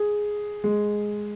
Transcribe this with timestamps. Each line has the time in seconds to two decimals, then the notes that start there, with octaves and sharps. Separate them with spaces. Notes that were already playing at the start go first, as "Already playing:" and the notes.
Already playing: G#4
0.64 G#3